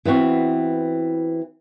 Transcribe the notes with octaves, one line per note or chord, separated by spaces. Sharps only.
E3 B3 C4 F#4